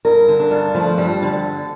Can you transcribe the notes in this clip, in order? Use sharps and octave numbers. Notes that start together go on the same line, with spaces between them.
G2 A#4
D3
D4
G2
F3 A3
G2 G3
D3